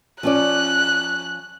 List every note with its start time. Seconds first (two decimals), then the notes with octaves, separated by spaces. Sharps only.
0.23 F3 C#4 D5 F#6